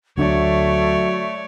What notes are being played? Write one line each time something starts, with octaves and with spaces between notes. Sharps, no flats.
D2 F#3 A3 D4 C#5 D5